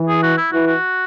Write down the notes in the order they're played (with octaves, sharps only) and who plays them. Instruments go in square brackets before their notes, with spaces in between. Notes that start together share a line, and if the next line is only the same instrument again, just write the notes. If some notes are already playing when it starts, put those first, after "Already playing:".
Already playing: [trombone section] E3
[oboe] G#4
F#4
E4
[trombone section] E3 [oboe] F#4
[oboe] F#4